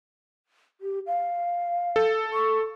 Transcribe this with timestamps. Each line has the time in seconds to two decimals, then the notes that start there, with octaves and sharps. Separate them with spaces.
0.81 G4
1.07 F5
1.96 A4
2.33 C#6